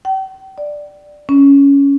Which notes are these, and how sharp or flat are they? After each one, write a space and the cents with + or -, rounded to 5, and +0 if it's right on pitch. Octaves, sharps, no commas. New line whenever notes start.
G5 -35
D5 +10
C#4 +10